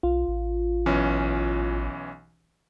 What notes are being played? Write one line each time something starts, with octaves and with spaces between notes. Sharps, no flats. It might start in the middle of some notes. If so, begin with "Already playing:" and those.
B1 F4
A1
B1 E3 C#4